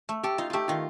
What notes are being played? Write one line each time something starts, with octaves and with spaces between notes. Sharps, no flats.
A3
G4 A4
D#4 F4
F4
A3 G4
D#3 F4